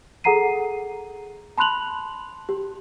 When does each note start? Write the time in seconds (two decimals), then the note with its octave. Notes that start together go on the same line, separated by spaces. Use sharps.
0.24 G#4 A4 F#5 A#5 C7 D#7
1.58 A5 B5 C6 F#6 F7 F#7
2.49 G4